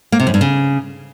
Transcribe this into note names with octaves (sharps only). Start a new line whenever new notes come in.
A#3
C3
F#2
G2
C#3